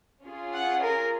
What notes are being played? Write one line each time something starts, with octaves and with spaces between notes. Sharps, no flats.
C#4 F4 G#4
F#5
A#4